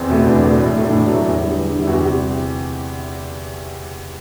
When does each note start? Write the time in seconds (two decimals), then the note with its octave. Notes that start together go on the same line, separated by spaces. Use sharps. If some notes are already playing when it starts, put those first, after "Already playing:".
Already playing: E2 C4
0.10 B2 A3
0.26 E2 D4
0.42 B2 A3
0.58 A2
0.74 F#3 A3
0.84 D4
0.90 A2 E4
1.06 F#3 A3
1.22 E2
1.39 D3 G3
1.55 E2
1.71 D3 G3
1.82 E4
1.87 E2 F#4
1.95 G4
2.03 C3 G3